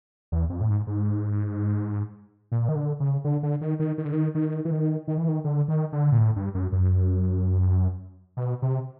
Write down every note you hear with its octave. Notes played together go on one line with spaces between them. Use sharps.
E2
F2
A2
G#2
G#2
A#2
D#3
D3
C#3
D3
D3
D#3
D#3
D#3
D3
D#3
D#3
E3
D#3
D#3
E3
D#3
D3
D#3
D3
A#2
A2
G2
F#2
F#2
B2
C3